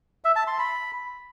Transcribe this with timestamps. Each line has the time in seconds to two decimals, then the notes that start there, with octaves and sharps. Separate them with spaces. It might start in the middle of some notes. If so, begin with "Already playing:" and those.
0.24 E5
0.36 A5
0.47 C6
0.59 B5